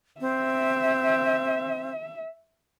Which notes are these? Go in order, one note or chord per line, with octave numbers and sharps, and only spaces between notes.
C4 E5